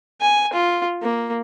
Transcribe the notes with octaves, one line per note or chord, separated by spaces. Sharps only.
G#5
F4
A#3